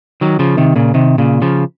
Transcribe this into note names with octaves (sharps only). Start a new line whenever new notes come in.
D#3 F#3
C#3 F3
C3 D#3
A#2 C#3
C3 D#3
A#2 C#3
C#3 F3